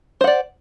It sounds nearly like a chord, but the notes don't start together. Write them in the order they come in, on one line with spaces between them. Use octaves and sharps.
C5 F#5 D5